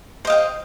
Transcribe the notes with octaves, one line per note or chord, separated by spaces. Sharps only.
C5 D#5 F5 G5